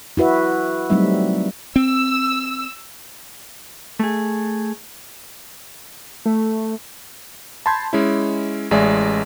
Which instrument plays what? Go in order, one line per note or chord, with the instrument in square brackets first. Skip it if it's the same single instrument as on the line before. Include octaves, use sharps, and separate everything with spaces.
[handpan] E4 F#4 B4 E5
F#3 G3 A3 C4 D#4 E5
[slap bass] C4 [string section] E6
[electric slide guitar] A3 G#4
[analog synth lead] A3
[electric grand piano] A5 B5 C6 G6 G#6
G#3 C#4 E4
A1 G#3 D5 E5 G#5